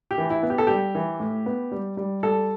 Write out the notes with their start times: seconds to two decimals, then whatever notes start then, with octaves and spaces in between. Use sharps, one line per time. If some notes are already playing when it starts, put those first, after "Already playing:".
0.11 G4
0.18 E3
0.30 E4
0.43 B3
0.50 G4
0.58 A4
0.67 G3 G4
0.95 E3
1.20 A2
1.46 B3
1.71 G3
1.97 G3
2.23 G3 A4